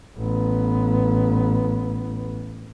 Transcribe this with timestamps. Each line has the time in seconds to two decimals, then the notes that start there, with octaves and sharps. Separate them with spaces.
0.18 A1 B3